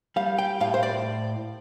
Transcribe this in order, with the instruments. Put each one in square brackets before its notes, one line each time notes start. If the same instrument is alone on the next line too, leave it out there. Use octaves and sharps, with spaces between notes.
[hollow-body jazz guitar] G3 F5
G5
A2 F5
C5
D5